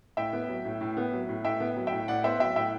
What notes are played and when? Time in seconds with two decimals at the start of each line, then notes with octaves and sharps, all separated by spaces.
0.17 A2 E5 G5
0.33 B3
0.49 F#3
0.65 A2
0.81 A2
0.97 B3
1.13 F#3
1.29 A2
1.44 A2 E5 G5
1.60 B3
1.76 F#3
1.87 E5 G5
1.92 A2
2.08 A2 D5 F#5
2.24 B3 C5 E5
2.40 F#3 E5 G5
2.56 A2 E5 G5